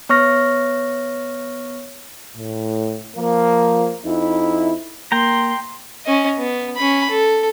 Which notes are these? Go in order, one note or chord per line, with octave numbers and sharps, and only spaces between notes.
B3 C#5 C#6 F6 A#6
A2
F3 A#3
F2 D#4 E4
A#3 G5 A#5 C6
C#4 D#5
B3
C#4 B5
A4